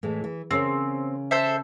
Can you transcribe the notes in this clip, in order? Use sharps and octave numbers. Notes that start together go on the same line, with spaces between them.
A2 E3 G#3
E3
C#3 C4 C#4 A#4
A4 C5 E5